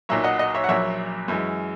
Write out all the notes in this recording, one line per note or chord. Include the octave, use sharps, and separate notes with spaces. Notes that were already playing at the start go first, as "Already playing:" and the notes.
B1 A#2 F#3 C#5 E5
D#5 F#5
D#5 F#5
C#5 E5
F#5
A#1 A#2 F#3 C#5 E5
F#2 E3 G#3